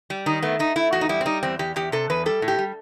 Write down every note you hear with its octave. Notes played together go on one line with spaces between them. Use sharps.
G3
D#3 D#4
A3 B3
A3 D#4
A3 E4
E2 F#4
D#4
G3 E4
C4
G3 D#4
E2 C4
E2 G4
E2 G4
C3 A4
E2 B4
G3 A4
A2
G4
G3